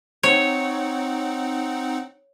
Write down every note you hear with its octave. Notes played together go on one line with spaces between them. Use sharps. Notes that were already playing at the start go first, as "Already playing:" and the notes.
C4 D#4 C#5 F#5